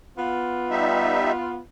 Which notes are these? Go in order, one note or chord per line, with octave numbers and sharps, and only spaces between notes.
B3 F4
G3 D#4 E5